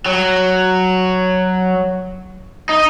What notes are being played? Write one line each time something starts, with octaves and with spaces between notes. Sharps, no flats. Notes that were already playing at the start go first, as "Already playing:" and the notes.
F#3
D#4